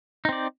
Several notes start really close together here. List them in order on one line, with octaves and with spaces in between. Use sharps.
D#4 C4 D5